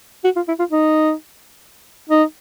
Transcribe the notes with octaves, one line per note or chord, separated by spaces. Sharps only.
F#4
F4
E4
F4
D#4
D#4